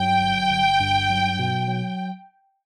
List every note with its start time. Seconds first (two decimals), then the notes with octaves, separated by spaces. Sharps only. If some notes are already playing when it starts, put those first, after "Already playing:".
Already playing: G2 F#3 G5
0.22 G1
0.51 G1
0.81 G2
1.10 F#3
1.39 B2
1.68 F#3